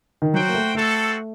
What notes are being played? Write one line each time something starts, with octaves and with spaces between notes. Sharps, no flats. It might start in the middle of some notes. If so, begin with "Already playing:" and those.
D#3
F#3 F#4 C5 G5
A#3
A3
A3 C4 F#4 A4